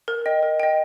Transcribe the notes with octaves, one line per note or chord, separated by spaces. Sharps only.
A#4
D#5 G5
A#4
D#5 G5